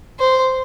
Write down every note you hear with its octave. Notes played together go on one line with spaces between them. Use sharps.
C5